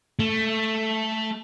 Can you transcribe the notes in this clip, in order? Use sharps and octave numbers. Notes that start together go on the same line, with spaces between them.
A3